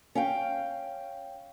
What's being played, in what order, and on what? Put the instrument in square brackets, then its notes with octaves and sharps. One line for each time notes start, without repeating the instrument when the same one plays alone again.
[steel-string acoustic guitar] C#4 F5 G5